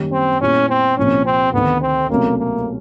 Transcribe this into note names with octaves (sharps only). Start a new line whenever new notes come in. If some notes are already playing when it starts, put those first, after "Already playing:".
Already playing: F#2 D#3 G3 A#3 C#4
C4
A#2 G3 B3 C#4 E4 G4
C4
C2 A#2 F3 A#3 C#4
C4
D2 C3 D#3 B3
C4
C2 B2 F#3 A3 A#3 C#4
A#3